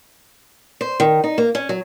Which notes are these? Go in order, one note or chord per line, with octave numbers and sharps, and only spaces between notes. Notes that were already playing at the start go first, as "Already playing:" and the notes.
C5
D#3
D#4
A#3
C#4
F#3